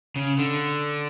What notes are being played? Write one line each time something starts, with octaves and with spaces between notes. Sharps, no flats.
C#3
D3